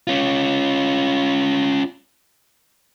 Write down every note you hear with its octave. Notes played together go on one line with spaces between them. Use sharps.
C#4 F4